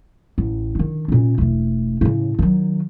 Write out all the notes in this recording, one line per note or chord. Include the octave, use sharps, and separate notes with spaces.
A1
D3 D#3
A#2 C#4
E1 A3
A2 C#3
D#3 F#3